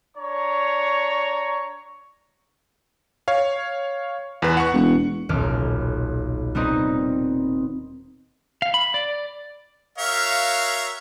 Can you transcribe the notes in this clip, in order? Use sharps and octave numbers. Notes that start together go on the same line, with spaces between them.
D4 C#5 A#5 C#6
C#5 F5
E2 B4
F#5 C#6
E1
D#1 B1 D6 F6
G3 B3 C4 D#4
F5
B5
D5
F#4 A#4 C#5 E5 F5